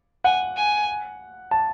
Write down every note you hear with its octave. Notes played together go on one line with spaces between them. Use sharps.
F#5 G#5
G#5
A5